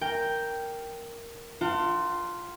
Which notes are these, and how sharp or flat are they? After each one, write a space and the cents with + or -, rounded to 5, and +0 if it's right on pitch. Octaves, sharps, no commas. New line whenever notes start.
A#4 +0 G5 +0
F4 +0 F#5 +40 A5 +35